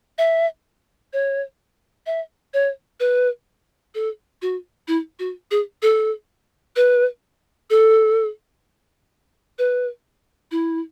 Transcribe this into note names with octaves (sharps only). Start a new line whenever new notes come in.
E5
C#5
E5
C#5
B4
A4
F#4
E4
F#4
G#4
A4
B4
A4
B4
E4